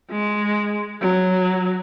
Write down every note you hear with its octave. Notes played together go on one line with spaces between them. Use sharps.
G#3
F#3